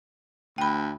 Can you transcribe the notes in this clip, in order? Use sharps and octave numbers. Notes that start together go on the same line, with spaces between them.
D2 G5 B5